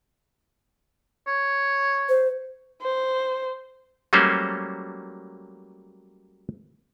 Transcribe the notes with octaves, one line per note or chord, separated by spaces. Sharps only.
C#5
C5
C5
F#3 G3 A3 A#3 C#4 C5